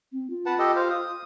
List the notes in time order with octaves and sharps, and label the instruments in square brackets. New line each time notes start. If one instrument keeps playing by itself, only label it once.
[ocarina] C4
F4
[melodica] B4 F#5 A5
G4 A4 D#5
C5 F5
D#6